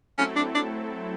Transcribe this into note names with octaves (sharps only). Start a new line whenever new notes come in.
F#3 A3 C4 C#4 E4 A4
D4
D4